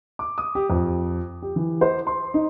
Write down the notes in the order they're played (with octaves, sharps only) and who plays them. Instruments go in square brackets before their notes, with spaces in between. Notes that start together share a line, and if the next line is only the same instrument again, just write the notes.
[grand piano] D6
D#6
G4
F2
G4
E3
C5
C6
D#4